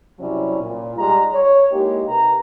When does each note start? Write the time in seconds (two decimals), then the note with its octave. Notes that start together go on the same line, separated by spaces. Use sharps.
0.19 C3 F#3 G3 C4 C#4 E4
0.61 A#2
0.97 G#2 G3 G#3 A#5
1.33 C#5
1.71 G#3 A#3 D#4 E4 G4
2.08 C3 A#4 B4 A#5